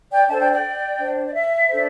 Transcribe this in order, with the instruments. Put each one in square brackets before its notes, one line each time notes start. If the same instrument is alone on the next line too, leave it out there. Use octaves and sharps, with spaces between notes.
[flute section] D5 G5
D4 A4 C5 E5 A5
D5 G5
D5 G5
D4 C5
D5
E5
D4 A4 C5